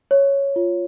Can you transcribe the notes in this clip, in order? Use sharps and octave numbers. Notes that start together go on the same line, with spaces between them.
C#5
F4